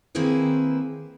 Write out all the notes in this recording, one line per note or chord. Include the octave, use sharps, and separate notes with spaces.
D#3 A#3 C4 E4 G#4 B4